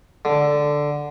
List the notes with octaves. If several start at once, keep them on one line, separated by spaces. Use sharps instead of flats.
D3